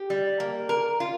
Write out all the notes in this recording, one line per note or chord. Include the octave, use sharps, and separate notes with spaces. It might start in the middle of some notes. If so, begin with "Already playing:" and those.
Already playing: G4
G3
A#3
A#4
F4